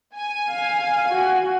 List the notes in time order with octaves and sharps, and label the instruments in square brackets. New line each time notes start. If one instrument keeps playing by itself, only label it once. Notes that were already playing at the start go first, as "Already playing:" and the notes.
[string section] G#5
[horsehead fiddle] F5
F#4